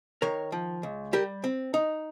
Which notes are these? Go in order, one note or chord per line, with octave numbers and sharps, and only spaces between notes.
D#3 A#4 C#5
F3
C#2
G3 G4 A#4
C4
D#4